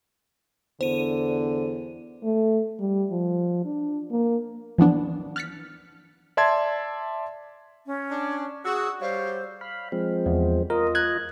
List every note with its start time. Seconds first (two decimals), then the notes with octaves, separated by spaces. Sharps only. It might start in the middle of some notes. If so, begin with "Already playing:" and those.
0.81 E2 D3 C5 D#7
2.23 A3
2.79 G3
3.11 F3
3.65 D4
4.11 A#3
4.78 E3 F3 B3 D4
5.36 F6 F#6 A6 B6 C#7
6.37 D5 E5 A5 C6 G#6
7.86 C#4
8.11 D4
8.65 F#4 G#4 E6
9.01 G3 C5 C#5 F5
9.61 F5 B5
9.92 F3 G#3 C4
10.26 E2
10.70 F4 A#4 D#5
10.95 F#6 G#6